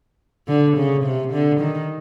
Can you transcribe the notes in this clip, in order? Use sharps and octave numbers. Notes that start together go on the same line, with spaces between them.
D3
C#3
C3
D3
D#3